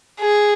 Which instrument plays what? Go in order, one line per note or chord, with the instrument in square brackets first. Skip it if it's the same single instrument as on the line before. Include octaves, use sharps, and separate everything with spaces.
[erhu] G#4